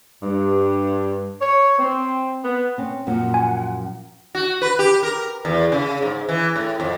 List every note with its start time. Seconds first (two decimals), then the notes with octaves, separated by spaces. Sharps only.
0.23 G2
1.41 C#5
1.79 C4
2.43 B3
2.78 C4 C#4
3.07 F#2 A#2 F3 F#5
3.34 G#5
4.35 F#4
4.62 B4
4.79 G4
5.03 A#4
5.45 E2
5.72 C#3
6.02 G#2
6.29 E3
6.56 A2
6.80 F2